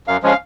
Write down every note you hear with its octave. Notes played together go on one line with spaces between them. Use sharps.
F#2 F5
F3 G#3 C#4 F5